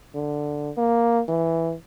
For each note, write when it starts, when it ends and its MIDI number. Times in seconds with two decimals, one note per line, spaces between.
0.15 0.71 50
0.77 1.21 58
1.28 1.73 52